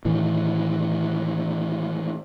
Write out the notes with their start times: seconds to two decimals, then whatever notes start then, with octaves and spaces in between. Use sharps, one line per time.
0.05 A2 D#3 E3